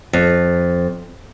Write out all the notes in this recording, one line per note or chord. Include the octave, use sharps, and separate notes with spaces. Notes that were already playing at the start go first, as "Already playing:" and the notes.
F2